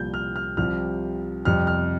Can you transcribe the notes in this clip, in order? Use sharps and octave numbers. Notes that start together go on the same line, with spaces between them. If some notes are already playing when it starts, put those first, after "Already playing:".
Already playing: C2 A#2 F3 G6
F6
F6
C2 C3 F3 F6
F2 C3 G3 F6
F6